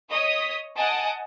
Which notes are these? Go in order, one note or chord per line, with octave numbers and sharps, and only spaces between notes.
C#5 D#5 D#6 B6
D#5 F#5 G#5 A5 D7